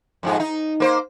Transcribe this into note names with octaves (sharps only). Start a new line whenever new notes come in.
F2 G#2 G#3
D#4
A#3 B4 C5